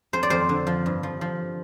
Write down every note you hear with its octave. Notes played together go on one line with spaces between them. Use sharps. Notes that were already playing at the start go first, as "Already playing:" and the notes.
F2 C5
D5
F2 C5
D3
F3
G2
F3
F3